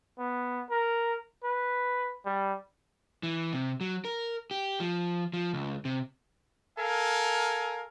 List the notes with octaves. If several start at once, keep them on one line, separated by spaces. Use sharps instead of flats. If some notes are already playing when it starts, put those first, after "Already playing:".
B3
A#4
B4
G3
E3
C3
F#3
A#4
G4
F3
F3
C#2
C3
A4 A#4 F5 G#5